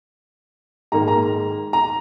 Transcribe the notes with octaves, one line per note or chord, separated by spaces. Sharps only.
G#2 D#3 A#3 A#5
A#5
A#5